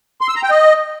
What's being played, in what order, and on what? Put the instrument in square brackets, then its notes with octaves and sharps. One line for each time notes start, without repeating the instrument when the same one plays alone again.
[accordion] C6
E6
A#5
G5
D#5